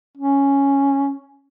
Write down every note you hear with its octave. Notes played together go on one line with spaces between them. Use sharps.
C#4